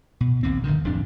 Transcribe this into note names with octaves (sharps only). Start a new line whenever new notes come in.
B2
A#1 D#2 C4
F1 G2 D3 D#3
D1 F2 G#2 D4